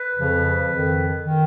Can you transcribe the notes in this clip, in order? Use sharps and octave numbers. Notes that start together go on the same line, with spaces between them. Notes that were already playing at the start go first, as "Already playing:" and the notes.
Already playing: B4
F2 C#3 F3
F2 D#3
D#3